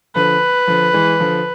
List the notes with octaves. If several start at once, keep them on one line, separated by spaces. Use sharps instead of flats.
D3 F3 B4
D3 F3
E3 G#3
D3 F3